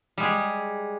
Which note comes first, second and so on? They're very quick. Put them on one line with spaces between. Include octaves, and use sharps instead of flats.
G3 G#3 G#4 G4